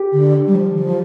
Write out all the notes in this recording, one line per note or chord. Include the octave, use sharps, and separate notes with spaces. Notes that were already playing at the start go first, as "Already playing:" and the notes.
Already playing: G4
D3
G3
F3
F3